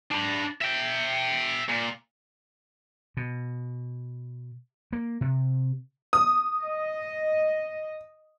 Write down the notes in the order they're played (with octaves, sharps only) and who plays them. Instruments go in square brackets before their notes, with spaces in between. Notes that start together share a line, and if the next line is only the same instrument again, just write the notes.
[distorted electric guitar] D4 B5
E5 G5
A#2
[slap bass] B2
A#3
C3
[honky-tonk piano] D#6
[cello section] D#5